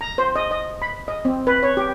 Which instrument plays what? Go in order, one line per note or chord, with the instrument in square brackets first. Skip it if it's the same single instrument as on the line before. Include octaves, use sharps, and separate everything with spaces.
[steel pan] A#5
C5
D#5
D#5
B5
D#5
C4
B4
C#5
G4